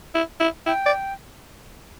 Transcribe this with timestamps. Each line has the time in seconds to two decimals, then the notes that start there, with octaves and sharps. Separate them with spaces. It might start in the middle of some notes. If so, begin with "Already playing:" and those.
0.15 E4
0.40 E4
0.66 E4 G5
0.86 D5